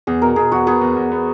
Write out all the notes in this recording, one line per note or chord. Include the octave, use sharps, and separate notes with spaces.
E2 G#4
B2 A#4
B2 G#4
E2 F#4
B3 G#4
E2
E2
B3